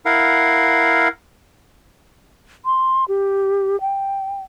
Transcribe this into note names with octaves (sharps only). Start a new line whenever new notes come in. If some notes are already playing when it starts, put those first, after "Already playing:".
E4 A#4 F5 F#5
C6
G4
G5